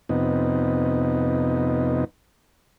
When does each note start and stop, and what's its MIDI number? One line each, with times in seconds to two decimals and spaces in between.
0.09 2.04 41
0.09 2.04 48
0.09 2.04 59
0.09 2.04 63